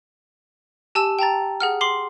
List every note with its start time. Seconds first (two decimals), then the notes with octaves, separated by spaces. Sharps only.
0.95 G4 G#5 A5 E6 E7
1.19 G5 A5 A#5 A6
1.60 G#4 F#5 F6
1.81 C6 D6 C7 F#7